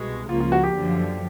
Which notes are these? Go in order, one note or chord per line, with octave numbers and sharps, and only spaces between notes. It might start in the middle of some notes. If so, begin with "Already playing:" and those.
Already playing: C2 B2 G#3
C#2 C#3 F3 A#3 F4
F4
F#4
G4
F#2 D3 F3